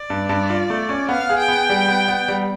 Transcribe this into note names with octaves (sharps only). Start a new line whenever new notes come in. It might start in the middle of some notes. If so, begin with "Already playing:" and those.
Already playing: D5
G2
G2
F4
A3
C#4
B3 F5
G#4
G5
B3
G3
B3
B3
G3